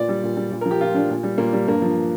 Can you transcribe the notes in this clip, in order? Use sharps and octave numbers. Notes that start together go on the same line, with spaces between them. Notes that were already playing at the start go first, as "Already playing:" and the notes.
Already playing: A#2 D5
G3
A#2
G3
A#2
A#4
F3
G4
A#2 F4
F3 D4
A#2
G3
A#2 A#3
G3
G2 A#3
F3